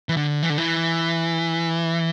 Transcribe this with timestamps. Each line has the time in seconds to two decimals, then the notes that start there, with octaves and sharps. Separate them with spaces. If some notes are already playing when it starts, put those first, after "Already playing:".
0.09 E3
0.17 D3
0.43 E3
0.50 D3
0.58 E3